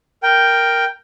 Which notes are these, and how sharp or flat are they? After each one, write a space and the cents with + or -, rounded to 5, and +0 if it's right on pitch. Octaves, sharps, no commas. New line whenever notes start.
A#4 +0 G5 +0